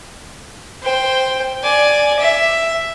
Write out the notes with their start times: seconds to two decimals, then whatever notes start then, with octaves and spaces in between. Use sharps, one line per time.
0.83 C5 G5
1.63 D5 G#5
2.19 E5